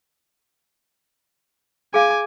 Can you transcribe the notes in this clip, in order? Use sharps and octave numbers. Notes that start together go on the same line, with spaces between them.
G#4 F5 G#5 D6